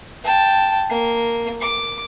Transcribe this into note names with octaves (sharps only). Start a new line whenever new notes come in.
G5 A5
A#3
D6